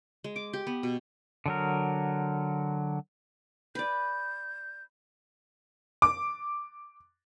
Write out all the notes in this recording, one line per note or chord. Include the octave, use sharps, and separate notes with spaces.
G#3
D6
G4
B3
B2
D3 F#3 A#4
B4 D5 G6
D6